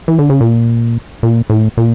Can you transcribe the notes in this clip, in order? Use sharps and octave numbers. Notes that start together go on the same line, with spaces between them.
E3
D3
C#3
A#2
A#2
A2
A#2